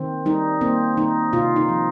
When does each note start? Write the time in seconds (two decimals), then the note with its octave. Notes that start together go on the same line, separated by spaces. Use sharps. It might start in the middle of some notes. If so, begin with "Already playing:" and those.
Already playing: D#3 C4
0.26 G3 D#4
0.61 A#3 C4
0.97 D#3 D#4
1.33 C3 F4
1.56 D#4
1.69 F3